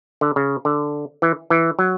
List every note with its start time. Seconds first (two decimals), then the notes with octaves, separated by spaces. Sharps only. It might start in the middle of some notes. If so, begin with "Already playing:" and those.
0.21 D3
0.36 C#3
0.65 D3
1.22 E3
1.50 E3
1.79 F#3